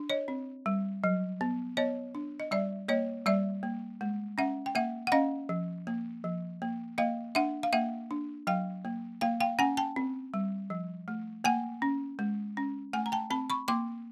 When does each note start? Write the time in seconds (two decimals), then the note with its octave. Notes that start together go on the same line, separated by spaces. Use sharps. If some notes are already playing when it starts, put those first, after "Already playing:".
Already playing: D4
0.10 C#5 D#5
0.28 C4
0.66 G3
1.04 F#3
1.41 B3
1.77 B3 C#5 D#5
2.15 D4
2.40 D#5
2.51 G3 D5 E5
2.88 A#3 C#5 D#5
3.26 G3 D5 E5
3.63 A#3
4.01 G#3
4.38 C#4 E5 F#5
4.66 G5
4.75 A#3 E5 F#5
5.07 F#5
5.12 C#4 D#5 F5
5.49 F3
5.87 A#3
6.24 F3
6.62 A#3
6.98 A#3 D#5 F5
7.35 D4 E5 F#5
7.63 F5
7.73 A#3 E5 F#5
8.11 D4
8.47 F#3 F5 G5
8.85 A#3
9.21 A#3 F5 G5
9.40 F5 G5
9.59 C#4 F#5 G#5
9.77 G5 A5
9.96 C4
10.34 G3
10.70 F3
11.08 A3
11.44 A#3 F#5 G#5
11.82 C#4
12.19 G#3
12.57 C#4
12.93 A3 F#5 G#5
13.06 A#5
13.12 G5 A5
13.30 C4 A5 B5
13.50 B5 C#6
13.68 A#3 C6 D6